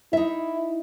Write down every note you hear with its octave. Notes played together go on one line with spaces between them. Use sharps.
D#4 E4 E5